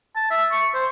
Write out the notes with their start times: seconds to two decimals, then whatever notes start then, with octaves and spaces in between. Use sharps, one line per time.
0.16 A5
0.30 E5
0.52 C#6
0.75 C5